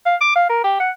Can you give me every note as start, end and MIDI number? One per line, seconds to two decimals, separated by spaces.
0.06 0.16 77
0.21 0.33 86
0.36 0.45 77
0.49 0.62 70
0.64 0.79 67
0.80 0.90 78